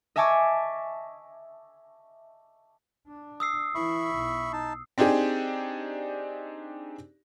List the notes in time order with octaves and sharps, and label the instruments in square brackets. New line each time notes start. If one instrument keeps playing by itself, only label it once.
[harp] D#5 E5 G#5 A5 C#6 D6
[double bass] D4
[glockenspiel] D#6 E6 C7
[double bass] E3 E4 [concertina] E5 B5 C#6
[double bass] B1
[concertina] D#4 A5
[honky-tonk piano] C4 D4 D#4 G4 G#4